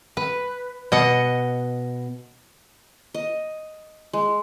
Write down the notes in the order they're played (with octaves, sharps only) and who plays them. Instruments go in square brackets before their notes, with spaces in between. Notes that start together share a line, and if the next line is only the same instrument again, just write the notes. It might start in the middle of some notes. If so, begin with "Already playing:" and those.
[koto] B4
B2 D#5 F#5
[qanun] D#5
G#3